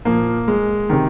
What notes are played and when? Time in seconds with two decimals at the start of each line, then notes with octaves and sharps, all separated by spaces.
0.05 A#2 F3 A#3
0.48 G#3
0.90 C3 D#3